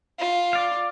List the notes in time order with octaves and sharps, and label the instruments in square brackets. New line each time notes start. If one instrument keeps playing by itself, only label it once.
[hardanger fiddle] F4
[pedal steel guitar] D5 F5